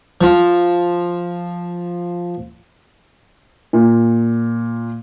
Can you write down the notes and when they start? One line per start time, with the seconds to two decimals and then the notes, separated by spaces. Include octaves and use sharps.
0.21 F3 F4
3.73 A#2